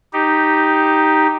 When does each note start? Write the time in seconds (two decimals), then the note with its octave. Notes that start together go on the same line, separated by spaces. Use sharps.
0.13 D#4 G4